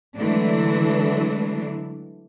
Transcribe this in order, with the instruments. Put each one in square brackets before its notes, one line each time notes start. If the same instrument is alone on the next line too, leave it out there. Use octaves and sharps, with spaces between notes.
[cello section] D3 E3 F#3 G#3 A3 D4